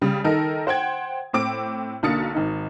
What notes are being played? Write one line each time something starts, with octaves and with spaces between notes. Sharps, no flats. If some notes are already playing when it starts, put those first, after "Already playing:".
C#3 G3
D#3 D#4 A4 A#4
C5 F#5 G5 G#6
A2 C4 D6 D7
B1 D3 A#3 D#6 A6 C#7
G#1 D#4